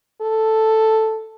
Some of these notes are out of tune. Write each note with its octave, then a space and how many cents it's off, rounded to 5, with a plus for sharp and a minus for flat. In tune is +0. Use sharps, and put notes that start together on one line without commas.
A4 +0